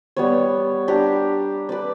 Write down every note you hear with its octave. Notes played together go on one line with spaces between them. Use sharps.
G3 B3 C#5
D4 G4 A#5
B4 D5